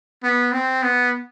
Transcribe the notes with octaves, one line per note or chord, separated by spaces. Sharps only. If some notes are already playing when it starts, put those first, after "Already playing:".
B3
C4
B3